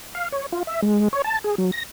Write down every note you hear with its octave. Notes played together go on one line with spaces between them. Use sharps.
F5
C#5
F4
E5
G#3
C#5
A5
G#4
F#3
A#6